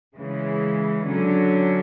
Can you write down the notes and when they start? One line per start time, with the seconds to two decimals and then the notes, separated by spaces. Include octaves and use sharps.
0.15 C#3 E3 G#3
1.07 D3 F#3 C#4